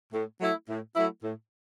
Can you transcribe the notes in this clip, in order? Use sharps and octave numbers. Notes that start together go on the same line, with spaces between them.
A2
F#3 A3 E4
A2
F#3 A3 E4
A2